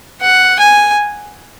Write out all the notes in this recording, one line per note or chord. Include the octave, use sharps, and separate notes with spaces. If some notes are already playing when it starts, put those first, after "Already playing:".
F#5
G#5